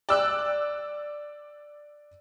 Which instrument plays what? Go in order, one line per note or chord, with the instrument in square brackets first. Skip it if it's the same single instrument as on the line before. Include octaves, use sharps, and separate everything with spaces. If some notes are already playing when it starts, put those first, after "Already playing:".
[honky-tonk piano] D5 E6 F#6